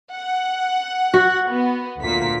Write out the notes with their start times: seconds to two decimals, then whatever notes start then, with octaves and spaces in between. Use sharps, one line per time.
0.11 F#5
1.14 F#4
1.49 B3
2.01 D2 A#2 B6